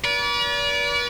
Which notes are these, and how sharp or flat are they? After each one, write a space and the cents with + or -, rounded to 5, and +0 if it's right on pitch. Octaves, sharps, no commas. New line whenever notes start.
B4 -45 D5 -35